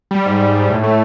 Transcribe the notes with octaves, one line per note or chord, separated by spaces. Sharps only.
G3
G#2
G3
G#2
A2
A3